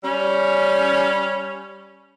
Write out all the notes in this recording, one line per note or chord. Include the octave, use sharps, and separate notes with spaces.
G3 C#4